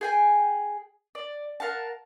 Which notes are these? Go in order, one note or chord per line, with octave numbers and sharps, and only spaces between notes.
G#4 G5 G#5
D5
A#4 F5 F#5 A5